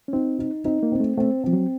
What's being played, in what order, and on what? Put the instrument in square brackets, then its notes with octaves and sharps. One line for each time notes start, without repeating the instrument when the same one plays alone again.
[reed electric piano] C#4
[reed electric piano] C4 [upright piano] D#4
[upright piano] D#4
[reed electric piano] C4 [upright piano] D#4
[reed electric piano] A#3
[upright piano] C4
[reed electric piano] A3
[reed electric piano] A3 [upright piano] C4
[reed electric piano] F3 [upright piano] C4
[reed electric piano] F#3